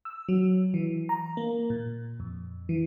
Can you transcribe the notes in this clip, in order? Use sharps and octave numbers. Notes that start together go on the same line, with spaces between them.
E6
F#3
E3
A#5
A#3
A#2
F2
E3